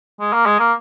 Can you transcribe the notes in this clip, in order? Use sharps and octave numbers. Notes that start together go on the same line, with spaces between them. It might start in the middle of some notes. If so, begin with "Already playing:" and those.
G#3
A#3
G#3
A#3